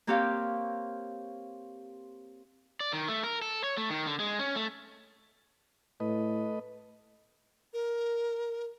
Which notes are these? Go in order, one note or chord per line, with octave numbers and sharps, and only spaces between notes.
A#3 C4 G4 C#5 F5
D5
D#3
A3
A#4
A4
C#5
A3
D#3
D3
G#3
C#4
A3
A2 A3 B4 D#5
A#4